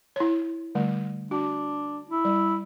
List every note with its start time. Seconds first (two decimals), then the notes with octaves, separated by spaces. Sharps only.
0.16 E4 C#5
0.75 D3 G3 A3
1.31 D4 F#4
2.09 E4
2.25 G3